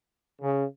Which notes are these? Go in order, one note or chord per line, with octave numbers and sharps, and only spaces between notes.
C#3